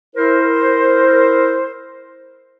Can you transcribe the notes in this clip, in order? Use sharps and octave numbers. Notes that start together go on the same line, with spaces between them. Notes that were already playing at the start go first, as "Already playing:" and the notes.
E4 A#4 C5